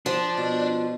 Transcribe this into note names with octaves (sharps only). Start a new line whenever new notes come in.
F3 D4
B2